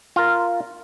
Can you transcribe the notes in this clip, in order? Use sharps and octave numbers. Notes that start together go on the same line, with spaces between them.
F4 A#4